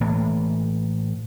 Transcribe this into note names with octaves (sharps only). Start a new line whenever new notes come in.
A2 E3 A#3